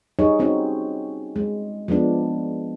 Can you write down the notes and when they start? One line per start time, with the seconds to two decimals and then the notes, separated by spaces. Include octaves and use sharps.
0.19 G3 D#4 G#4 C#5
0.39 G3 C4 C#4 D#4 F#4
1.36 G#3
1.88 F3 G#3 B3 D4